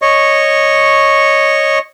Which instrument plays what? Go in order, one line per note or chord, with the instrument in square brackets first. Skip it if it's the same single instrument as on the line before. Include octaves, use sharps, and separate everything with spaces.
[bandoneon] C#5 D#5 C#6